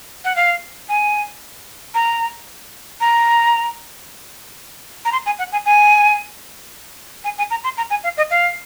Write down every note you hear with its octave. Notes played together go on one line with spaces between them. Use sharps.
F#5
F5
G#5
A#5
A#5
A#5
C6
G#5
F#5
G#5
G#5
G#5
G#5
A#5
C6
A#5
G#5
F5
D#5
F5